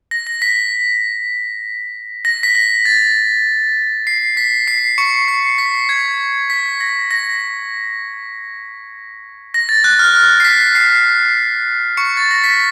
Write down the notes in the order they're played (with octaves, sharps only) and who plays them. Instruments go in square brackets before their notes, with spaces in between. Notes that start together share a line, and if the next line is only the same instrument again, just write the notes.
[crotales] A#6
A#6
B6
A#6
B6
A#6
A6
C7
B6
C7
C#6 C#7
C7
B6
G#6
B6
A#6
A#6
A#6
A6
F#6
F6
F6
C7
B6
C7
C#6 C#7
A6
A#6
B6